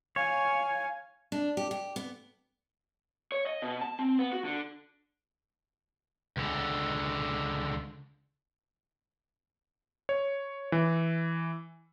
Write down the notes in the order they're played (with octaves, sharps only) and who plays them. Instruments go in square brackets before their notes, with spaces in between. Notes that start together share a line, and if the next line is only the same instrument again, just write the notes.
[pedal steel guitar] C#5 [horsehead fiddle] F5 G#5
[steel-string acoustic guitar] D4
G4
G4
B3
[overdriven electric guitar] C#5
D#5
B2
A5
C4
B3
F#4
D3
C#2 D3
[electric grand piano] C#5
E3